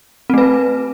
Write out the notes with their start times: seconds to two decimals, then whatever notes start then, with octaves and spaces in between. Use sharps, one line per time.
0.30 C4
0.34 A3
0.38 B4